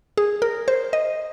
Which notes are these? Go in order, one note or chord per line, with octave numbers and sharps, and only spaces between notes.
G#4
A#4
C5
D#5